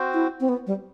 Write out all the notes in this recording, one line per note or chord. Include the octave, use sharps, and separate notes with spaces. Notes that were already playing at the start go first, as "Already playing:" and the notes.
Already playing: C4 F#4 C5
E4
C4
B3
G3